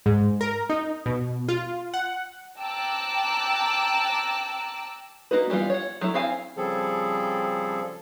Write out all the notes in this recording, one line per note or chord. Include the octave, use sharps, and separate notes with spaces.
G#2
A#4
D#4
B2
F4
F#5
G5 A5 A#5 D6 E6 F#6
A#3 D#4 F#4 B4
E3 G3 B3 F4
C#5 F#5
F#3 A3 E4
C4 E4 F5 G#5
C#3 F3 G3 C4 G#4 A4